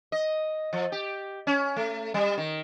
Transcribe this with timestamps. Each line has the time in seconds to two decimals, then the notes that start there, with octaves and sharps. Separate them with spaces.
0.12 D#5
0.73 F3
0.92 G4
1.47 C#4
1.76 A3
2.14 G3
2.38 D#3